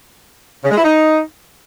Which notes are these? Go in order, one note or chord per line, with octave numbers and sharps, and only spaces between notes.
C#3
G#3
E4
D#4